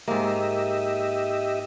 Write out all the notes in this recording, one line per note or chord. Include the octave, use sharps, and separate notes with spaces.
G#2 A#3 G4 D#5 E5